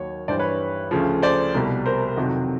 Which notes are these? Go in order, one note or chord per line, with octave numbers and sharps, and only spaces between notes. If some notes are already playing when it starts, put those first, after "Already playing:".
Already playing: D#2 D#3 F#3 C#5
G2 E3 G3 C5 D5
B4 C#5
D2 C#3 F3
C5 D5
C2 B2 G3
A#4 C5
F2 C3 D#3 F#3